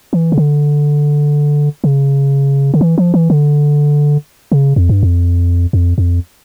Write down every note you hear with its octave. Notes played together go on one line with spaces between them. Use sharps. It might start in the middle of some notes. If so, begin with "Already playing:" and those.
E3
C#3
D3
C#3
D3
E3
F3
E3
D3
C#3
F2
G2
F2
F2
F2